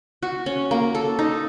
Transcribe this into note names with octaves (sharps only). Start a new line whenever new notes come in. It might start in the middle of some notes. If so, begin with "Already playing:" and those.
F#4
C#4
A#3
A4
D#4